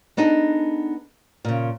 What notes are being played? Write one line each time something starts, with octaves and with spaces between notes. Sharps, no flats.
B3 D4 D#4 G#4 A4
A#2 C#3